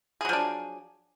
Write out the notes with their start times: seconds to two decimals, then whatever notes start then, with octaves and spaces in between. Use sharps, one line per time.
0.21 G#4
0.25 F#3
0.29 F3
0.33 D4